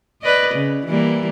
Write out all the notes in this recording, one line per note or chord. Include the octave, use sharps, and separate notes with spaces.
B4 D5 D#5
C#3
E3 G3 A#3